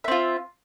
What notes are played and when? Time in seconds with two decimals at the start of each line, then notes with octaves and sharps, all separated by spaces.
0.04 E5
0.08 C4
0.11 F4